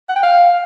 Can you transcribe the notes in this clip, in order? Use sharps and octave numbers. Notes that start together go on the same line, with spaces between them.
F#5
G5
F5